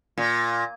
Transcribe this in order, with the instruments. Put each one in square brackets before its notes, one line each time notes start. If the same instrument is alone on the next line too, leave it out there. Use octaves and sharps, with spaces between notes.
[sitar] A#2